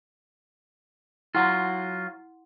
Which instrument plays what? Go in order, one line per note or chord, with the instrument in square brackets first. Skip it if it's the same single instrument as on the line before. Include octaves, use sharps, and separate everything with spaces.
[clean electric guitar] F#3 F4 [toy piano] E4 F#5 C6